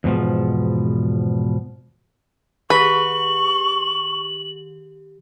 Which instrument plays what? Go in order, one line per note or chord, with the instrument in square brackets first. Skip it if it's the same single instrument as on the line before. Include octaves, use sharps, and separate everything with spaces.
[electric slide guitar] E2 G#2 B2 F3
[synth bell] D#3 G4 [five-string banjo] B4 [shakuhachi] C#6 [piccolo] F#7